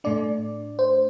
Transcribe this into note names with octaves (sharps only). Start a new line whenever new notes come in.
A2 A3 D4 D5
C5